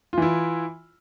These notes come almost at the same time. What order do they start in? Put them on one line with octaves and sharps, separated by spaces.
F4 E3 E4